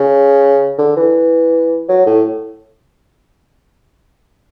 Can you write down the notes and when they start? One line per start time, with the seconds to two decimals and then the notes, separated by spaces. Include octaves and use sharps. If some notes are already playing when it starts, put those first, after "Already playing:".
Already playing: C#3
0.78 D3
0.96 E3
1.89 F#3
2.06 A2